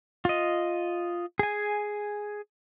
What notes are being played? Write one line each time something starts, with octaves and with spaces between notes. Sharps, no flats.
F4 D#5
G#4 G#5